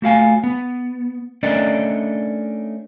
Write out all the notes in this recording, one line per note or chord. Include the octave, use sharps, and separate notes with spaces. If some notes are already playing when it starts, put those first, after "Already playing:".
A3 F#4 F5 G#5
B3
A3 C#4 D4 A#4 D5 D#5